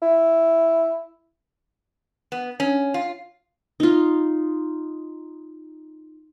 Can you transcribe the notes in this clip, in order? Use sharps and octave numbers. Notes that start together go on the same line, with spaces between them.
E4
B3
C#4
F4
D#4 F4